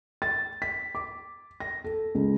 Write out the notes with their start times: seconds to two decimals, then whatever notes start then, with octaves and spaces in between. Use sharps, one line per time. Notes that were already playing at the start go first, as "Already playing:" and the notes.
0.22 A6
0.62 B6
0.95 D6
1.60 A#6
1.84 A4
2.15 C#2